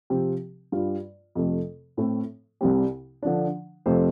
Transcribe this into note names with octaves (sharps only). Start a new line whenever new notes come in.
C3 F3 C4 G4
G2 G3 F4
F2 C3 A3
A2 A3 C4
C2 C3 G3 C4 G4
D3 F3 D4
F2 C3 A3 F4 C5